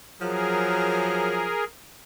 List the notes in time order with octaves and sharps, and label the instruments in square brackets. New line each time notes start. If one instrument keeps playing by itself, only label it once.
[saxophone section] F3 F#3 [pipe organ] G#4 A#4